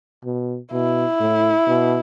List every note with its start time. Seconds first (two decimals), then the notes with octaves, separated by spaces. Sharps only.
0.25 B2
0.72 B2 E4
1.20 A2
1.67 B2